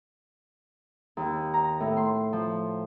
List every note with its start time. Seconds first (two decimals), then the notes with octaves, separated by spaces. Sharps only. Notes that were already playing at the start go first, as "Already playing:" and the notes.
1.17 D#2
1.54 A#5
1.80 A2
1.97 C6
2.33 F3